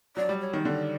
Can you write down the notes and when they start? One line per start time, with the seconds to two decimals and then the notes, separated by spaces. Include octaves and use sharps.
0.17 F#3 D5
0.29 G3
0.41 C#5
0.53 D#3
0.65 D3 D5